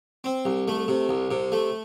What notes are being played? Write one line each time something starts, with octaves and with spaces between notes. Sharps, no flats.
C4
C2
A3
C3
C2
C3
A3